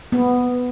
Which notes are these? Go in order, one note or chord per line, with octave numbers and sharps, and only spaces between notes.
B3